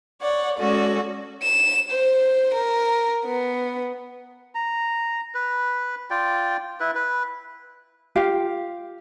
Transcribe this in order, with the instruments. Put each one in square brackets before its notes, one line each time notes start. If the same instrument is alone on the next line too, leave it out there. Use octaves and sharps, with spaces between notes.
[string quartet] C#5 D5 F#5
G#3 C#4 F#4 A4 D5
[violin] E7
C5
A#4
B3
[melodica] A#5
B4
F4 D5 G5
E4 B4
B4
[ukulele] F4 G4 F5